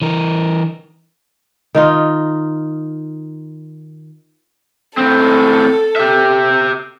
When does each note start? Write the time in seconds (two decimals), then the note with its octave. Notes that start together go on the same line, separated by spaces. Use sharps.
0.02 E3 A#4
1.75 D#3 D#4 F4
4.97 A2 C4 A4
5.96 G4 E5